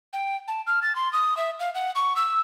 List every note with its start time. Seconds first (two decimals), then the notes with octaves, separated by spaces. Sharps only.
0.13 G5
0.48 A5
0.67 F6
0.82 A6
0.95 C6
1.13 D#6
1.37 E5
1.60 F5
1.75 F#5
1.95 C#6
2.16 E6